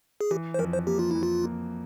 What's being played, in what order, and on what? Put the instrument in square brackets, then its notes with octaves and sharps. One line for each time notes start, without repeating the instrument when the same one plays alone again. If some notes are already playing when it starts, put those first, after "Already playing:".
[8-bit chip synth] G#4
[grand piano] E3 [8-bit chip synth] G4
[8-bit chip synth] C5
[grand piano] F2 [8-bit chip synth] A#4
[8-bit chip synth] C5
[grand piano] A#3 [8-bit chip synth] G4
[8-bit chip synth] F4
[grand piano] F2 [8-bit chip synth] E4
[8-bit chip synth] F4
[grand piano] A#3